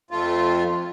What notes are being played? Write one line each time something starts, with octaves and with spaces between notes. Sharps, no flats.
F2 A3 F4